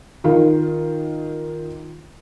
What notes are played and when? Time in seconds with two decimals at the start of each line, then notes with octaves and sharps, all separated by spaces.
0.24 D#3 F4